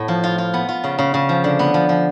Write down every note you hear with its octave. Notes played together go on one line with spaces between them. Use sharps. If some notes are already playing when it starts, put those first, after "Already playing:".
Already playing: A2 B3
F3
F4
F4
B3
F4
C#3
C#3
C#3
F3
D3
B3
F3
F3